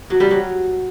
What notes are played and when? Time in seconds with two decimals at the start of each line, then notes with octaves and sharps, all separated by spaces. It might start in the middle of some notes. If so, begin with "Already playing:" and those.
0.10 F#3
0.20 G3
0.31 F#3